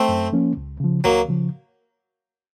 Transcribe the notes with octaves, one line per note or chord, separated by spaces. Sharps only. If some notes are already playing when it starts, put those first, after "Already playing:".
Already playing: A3 C4
F#2
F3 A#3 C#4
C#2
C#3 F3
C#2 F#3 A#3
C#3 F3